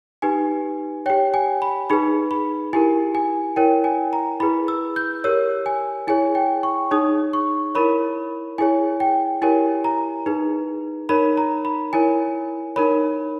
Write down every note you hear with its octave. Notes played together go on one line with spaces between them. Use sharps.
D#4 G4 B4 G#5
G4 C#5 G5
G#5
B5
D#4 G#4 B4 B5
B5
E4 G4 A#4 G#5
G#5
E4 A#4 C#5 G5
G#5
A#5
E4 G#4 B4 B5
E6
G6
G4 A#4 C#5 E6
G#5
E4 G#4 C#5 G#5
G5
C#6
D#4 G#4 C#5 D#6
C#6
E4 A#4 C#5 B5
E4 G#4 C#5 G#5
G5
E4 G4 A#4 C#5 G#5
A#5
D#4 G#4 B4
D#4 A#4 C#5 B5
A#5
B5
E4 A#4 C#5 G#5
D#4 A#4 C#5 B5